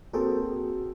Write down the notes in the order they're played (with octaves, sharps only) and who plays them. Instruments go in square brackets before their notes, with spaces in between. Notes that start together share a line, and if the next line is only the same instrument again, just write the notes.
[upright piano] A#3 C4 A4 [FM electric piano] F#4 G#4 G5